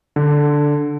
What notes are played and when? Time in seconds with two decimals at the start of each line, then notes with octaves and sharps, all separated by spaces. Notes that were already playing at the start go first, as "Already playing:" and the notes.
0.16 D3